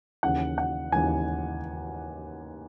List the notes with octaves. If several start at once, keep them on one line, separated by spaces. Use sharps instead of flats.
D#2 C#3 E3 F#5
F#5
D#2 C#3 E3 G#5